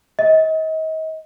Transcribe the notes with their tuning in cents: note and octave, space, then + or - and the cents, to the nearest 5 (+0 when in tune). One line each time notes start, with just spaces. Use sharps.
D#5 +35